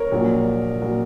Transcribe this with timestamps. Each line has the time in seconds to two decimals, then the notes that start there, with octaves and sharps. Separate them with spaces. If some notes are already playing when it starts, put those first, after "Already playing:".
Already playing: A#4 C#5
0.12 A#1 A#2 F#3
0.82 A#2 F#3